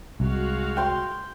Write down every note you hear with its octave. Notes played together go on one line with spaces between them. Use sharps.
C2 G#3 F#4 F5
G5 C6